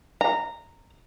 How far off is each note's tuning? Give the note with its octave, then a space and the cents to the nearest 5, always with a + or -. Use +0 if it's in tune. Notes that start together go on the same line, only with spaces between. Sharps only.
A#5 -10